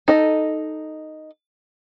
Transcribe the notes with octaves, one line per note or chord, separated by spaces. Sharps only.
D#4 A4 D#5